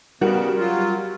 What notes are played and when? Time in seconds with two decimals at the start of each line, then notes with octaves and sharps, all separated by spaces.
0.21 C#3 G3 B3 F#4 A#4
0.57 F#3 F4